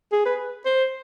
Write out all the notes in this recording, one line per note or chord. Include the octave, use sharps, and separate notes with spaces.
G#4
B4
C5